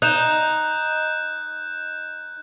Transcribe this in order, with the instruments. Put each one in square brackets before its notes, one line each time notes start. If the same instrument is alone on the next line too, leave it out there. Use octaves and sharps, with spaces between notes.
[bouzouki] D#4 [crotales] F#6 G6 E7